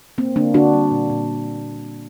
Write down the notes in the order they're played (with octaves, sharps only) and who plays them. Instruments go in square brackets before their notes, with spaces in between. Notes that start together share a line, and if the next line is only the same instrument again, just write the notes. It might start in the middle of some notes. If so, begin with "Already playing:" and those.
[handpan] A#3 C4
D3 A#3 D4
D3 D4 F#4
G3
A#2
A#2